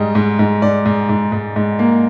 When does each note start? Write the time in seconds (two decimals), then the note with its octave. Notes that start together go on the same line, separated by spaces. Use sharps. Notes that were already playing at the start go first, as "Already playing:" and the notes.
Already playing: G#2 G3 D#5
0.15 G#2
0.39 G#2
0.62 G#2 D5
0.86 G#2
1.09 G#2
1.32 G#2
1.56 G#2
1.79 A#3